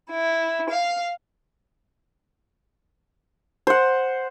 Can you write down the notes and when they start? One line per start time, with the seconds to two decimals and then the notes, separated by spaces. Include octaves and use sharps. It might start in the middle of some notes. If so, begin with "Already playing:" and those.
0.11 E4
0.70 F5
3.67 C5 F#5